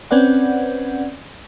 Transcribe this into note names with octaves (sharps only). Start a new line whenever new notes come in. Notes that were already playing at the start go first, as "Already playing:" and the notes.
C4 C#4 B4 D5 F#5